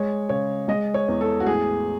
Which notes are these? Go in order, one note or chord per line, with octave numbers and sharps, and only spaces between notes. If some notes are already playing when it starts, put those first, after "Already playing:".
Already playing: G#3 C#5
C#3 C#5
G#3 D#5
C#5
E2
A4
F#4
A1 G#4